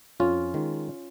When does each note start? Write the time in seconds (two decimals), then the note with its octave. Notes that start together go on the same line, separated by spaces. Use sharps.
0.20 F2 C#4 F4
0.54 D#3 G#3